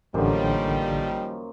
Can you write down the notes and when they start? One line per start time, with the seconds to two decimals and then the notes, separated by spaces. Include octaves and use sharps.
0.14 A1 F#2 D3 D#3 F3 G3 A#3 C5